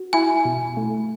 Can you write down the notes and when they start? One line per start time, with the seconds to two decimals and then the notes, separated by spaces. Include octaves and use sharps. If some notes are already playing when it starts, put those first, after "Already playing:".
Already playing: F#4
0.13 E4 G#5
0.45 B2
0.77 A3